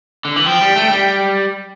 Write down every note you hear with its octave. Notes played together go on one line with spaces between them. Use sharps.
D3
E3
F3 G5
G3
A3
G3